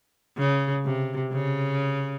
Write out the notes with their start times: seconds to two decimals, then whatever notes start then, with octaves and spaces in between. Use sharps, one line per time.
0.38 C#3
0.85 C3
1.32 C#3